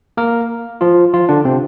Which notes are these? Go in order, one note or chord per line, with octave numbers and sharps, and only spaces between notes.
A#3 A#4
F3 F4
F3 F4
D3 D4
C3 C4